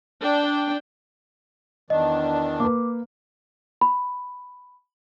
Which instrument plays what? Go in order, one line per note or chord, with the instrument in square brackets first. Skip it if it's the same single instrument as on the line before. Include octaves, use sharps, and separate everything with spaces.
[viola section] D4 G5
[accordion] E2 D#3 D4 [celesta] D#5
[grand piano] A#3 B4 [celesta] D6
[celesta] B5